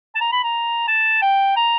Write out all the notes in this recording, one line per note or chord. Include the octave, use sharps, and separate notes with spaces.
A5
A#5
B5
A#5
A5
G5
A#5